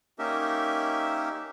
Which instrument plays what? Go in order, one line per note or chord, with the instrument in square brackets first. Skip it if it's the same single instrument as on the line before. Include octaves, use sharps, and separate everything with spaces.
[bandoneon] A#3 C#4 D#4 G4 A#4 E5